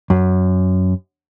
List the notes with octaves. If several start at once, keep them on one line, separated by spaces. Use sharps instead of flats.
F#2